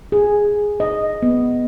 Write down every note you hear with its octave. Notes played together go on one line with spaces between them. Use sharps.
G#4
D#5
B3